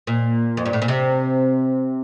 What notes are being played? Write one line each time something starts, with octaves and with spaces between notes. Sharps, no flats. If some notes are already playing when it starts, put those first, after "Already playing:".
A#2
F2
G2
A2
A#2
C3